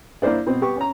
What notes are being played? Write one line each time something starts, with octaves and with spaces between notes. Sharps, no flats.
A#3 D4 E4 C5 D5
B2 C4
B3 G4 C#6
C#4 A#5